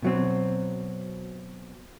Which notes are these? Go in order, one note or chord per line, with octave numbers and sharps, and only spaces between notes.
B2 F#3 C4